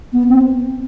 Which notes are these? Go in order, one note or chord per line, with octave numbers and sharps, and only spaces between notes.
B3
C4